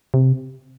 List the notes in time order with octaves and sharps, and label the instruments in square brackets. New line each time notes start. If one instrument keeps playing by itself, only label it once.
[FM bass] C3